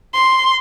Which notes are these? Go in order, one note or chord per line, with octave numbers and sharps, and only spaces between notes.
C6